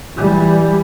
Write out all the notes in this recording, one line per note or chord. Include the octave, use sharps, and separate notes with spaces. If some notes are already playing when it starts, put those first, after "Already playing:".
E3 G3